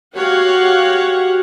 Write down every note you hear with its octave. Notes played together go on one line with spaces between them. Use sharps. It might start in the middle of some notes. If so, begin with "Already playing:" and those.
F#4 G4 C#5 F5 F#5